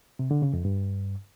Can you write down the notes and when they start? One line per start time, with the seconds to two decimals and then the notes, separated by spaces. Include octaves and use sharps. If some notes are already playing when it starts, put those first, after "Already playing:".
0.19 C3
0.31 D3
0.42 C#3
0.53 F2
0.65 G2